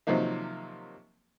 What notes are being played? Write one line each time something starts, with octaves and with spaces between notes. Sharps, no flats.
C3 D#3 F3 F#3 A#3 D#4